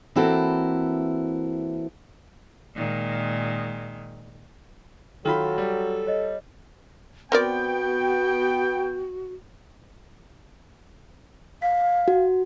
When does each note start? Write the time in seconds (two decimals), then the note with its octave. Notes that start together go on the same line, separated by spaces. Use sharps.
0.15 E3 A#3 C4 E4 F#4 A4
2.75 A#2 D#3 G#3
5.25 D#3 F#3 F4 A4 G5 B5
5.58 G3
6.07 C#5 D#5
7.32 B3 C4 F#4 A#4 D5 G5
11.62 F5 B6
12.08 F#4